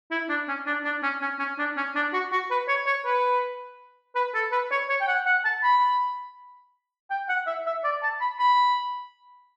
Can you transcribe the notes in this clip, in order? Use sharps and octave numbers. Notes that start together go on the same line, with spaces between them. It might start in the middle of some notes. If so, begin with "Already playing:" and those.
E4
D4
C#4
D4
D4
C#4
C#4
C#4
D4
C#4
D4
F#4
F#4
B4
C#5
C#5
B4
B4
A4
B4
C#5
C#5
G5
F#5
F#5
A5
B5
G5
F#5
E5
E5
D5
A5
B5
B5